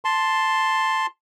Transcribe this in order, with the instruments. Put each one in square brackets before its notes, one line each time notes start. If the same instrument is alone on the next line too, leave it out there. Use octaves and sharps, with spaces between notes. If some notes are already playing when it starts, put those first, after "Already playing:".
[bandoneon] A5 C6